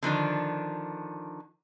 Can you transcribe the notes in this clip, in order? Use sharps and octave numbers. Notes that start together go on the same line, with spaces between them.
D3 D#3 F3 D4